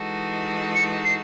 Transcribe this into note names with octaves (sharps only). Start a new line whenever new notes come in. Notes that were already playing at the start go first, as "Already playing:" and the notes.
Already playing: E3 G#3 D#4 F#4 A4
C#7
C7